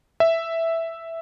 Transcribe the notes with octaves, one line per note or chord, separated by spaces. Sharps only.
E5